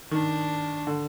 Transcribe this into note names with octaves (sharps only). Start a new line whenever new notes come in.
D#3 D4
D3